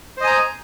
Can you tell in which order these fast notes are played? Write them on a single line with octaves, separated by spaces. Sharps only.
C5 D#5 G#5 A#5